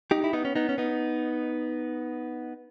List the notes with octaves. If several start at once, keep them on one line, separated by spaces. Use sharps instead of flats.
D#4 G4
E4
B3 D#4
C#4
B3 D#4
C#4
B3 D#4